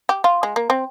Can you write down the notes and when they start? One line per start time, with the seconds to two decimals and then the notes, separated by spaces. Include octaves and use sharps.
0.09 G4
0.24 F4
0.43 G#3
0.56 A#3
0.70 C4